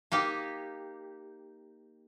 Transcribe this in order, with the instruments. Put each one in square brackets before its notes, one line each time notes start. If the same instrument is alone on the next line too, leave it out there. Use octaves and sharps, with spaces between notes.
[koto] A#3 D#4 G4